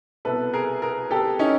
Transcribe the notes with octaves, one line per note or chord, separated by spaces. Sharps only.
C2 B2 A4 B4
G#4 A#4
G#4 A#4
G4 A4
C#4 D#4